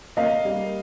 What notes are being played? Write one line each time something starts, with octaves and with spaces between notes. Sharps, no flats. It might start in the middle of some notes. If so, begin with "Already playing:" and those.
A#3 D#5 F5
G3